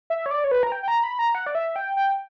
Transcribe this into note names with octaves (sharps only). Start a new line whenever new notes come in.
E5
C#5
D5
C#5
B4
A#5
G5
G5
A#5
B5
A#5
F#5
D5
E5
G5
G5